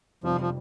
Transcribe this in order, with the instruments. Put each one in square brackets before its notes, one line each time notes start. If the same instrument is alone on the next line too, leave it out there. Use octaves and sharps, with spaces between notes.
[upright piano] F1 F2 C3 G3 [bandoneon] F3
[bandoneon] F3